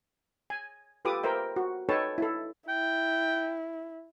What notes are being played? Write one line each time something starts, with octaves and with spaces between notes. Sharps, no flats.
G#5
F4 G4 A4 B4 D6 D#6
A#4 C5 E5 G5
F#4
D#4 A4 B4 C#5 G5 A5
E4 A4
E4 G5